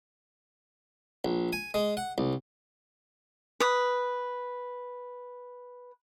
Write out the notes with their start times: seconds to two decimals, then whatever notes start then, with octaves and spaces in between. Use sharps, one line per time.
1.25 A#1
1.53 G#5
1.74 G#3
1.97 F#5
2.18 C2
3.60 B4 D#6